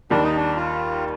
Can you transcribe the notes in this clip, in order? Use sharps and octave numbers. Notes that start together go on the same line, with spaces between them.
D#2 D#3 G3 D4
D#4
D4
F4